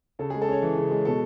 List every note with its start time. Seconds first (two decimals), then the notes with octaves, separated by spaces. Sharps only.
0.19 C#3 A4
0.30 G#4
0.34 G#3
0.42 A4
0.48 C#4 C#5
0.62 E3
0.77 C#3
0.91 G#3
1.05 B2 A4